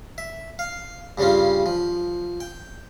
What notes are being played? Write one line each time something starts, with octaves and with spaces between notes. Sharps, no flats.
E5
F5
G2 C#3 G3 C#4 F4
F3
G5